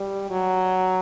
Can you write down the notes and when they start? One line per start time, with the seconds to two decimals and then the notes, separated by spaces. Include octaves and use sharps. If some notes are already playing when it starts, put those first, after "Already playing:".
Already playing: G3
0.30 F#3